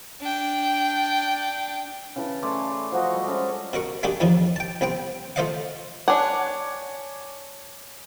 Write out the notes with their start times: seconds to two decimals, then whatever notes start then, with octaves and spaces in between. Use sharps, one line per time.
0.21 D4 G5
2.16 C#3 E3 A5
2.42 A3 D5 G#5 C6
2.92 F3 F#4 D#5
3.13 G3
3.27 G#3 A3 C#4
3.73 B2 F#4 A#4 C#6
4.03 G#3 A#3 D4 D#4 F#4 G4
4.20 E2 A2 F3 D#4
4.56 G5 A5
4.81 C2 B3 C4 G5
5.36 A3 F4 C5 D#5 F5 F#5
6.08 D4 C#5 F#5 G#5 D6